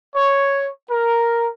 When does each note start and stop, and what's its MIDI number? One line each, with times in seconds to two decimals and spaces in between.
0.15 0.69 73
0.90 1.49 70